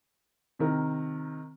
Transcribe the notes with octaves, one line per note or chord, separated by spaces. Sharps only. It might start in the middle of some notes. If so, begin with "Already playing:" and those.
C3 D#3 A#4